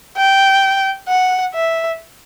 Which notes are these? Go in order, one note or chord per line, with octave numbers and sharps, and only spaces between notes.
G5
F#5
E5